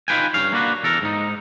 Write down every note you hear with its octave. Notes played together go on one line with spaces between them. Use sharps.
D#4 F4 B4 G5 G#5
G2 C#4 F5
A#3 D4 F#4 B4
E2 A4 A#4
G#2 D#4